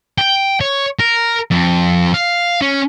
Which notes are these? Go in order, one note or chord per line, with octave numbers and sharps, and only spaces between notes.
G5
C#5
A#4
F2
F5
C#4